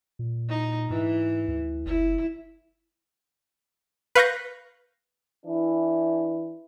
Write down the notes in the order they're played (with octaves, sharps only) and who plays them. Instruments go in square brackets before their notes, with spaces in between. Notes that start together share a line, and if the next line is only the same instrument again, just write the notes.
[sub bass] A#2
[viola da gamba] D#4
[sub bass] G#2 [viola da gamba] E3
[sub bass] D2
[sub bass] F#1 [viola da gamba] E4
[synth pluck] B4 F5 C#6 G6 A#6
[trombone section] E3 D4 E4